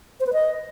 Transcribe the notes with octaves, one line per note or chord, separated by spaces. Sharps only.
C5
B4
D#5